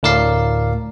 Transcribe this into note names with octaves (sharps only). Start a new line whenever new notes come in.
D2 A2 A#4 D5 F5 C7